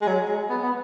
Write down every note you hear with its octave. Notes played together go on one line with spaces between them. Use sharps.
G#3
F#3
G#3
B3
B3